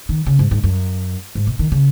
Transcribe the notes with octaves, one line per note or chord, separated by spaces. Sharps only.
D#3
C#3
G#2
G#2
F#2
G#2
B2
D#3
C#3